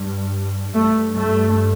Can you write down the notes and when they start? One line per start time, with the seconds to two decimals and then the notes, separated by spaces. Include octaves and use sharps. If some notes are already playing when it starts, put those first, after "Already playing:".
Already playing: G2
0.74 G2 A3
1.16 A3